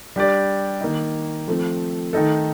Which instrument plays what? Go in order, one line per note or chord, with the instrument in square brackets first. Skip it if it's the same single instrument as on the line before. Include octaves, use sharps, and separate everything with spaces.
[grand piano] G3 D4 G4 D5
D#3 A#3 D#4
F3 A3 C4
D#3 A3 D#4 A4